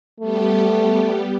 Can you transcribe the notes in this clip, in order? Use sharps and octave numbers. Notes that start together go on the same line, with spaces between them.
G3 A3 B3 G4